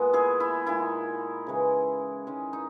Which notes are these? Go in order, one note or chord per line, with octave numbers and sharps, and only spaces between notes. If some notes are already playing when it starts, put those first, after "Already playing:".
Already playing: A#2 G#3 B3
E4 G#4
E4
A#2 G#3 D#4 E4
C#3 E3 G#3
D#3 G#3 C#4
D#4